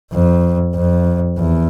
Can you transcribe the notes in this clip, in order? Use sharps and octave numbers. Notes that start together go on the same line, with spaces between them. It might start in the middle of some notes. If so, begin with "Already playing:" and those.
F2
F2
E2